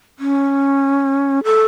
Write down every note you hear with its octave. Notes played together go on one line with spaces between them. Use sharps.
C#4
A4